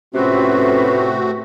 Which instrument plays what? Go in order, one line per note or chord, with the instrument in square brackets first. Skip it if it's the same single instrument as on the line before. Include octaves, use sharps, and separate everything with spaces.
[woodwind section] A2 F4 B4 [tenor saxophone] C3 [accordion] A3 C4 F#4 [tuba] C#4